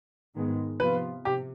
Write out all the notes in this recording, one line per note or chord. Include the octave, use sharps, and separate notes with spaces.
G#2 D#3 G#3 B3
C3 F3 B3 F4 B4
C3 G4